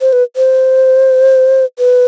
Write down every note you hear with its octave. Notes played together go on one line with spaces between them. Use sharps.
C5
B4
C5
B4